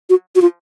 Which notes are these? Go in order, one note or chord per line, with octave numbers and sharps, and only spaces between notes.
F#4
F#4
F4